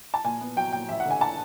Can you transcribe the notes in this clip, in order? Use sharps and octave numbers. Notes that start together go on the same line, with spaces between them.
A5
A#2 G#5
B3
F#3 G5
A#2 G5
A1 E5
F#5
D3
G#5
A5